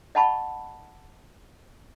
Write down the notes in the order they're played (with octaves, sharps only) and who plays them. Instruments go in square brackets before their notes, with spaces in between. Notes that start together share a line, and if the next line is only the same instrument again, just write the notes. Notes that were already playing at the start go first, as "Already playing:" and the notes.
[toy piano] D#5 F#5 A5 B5 C#6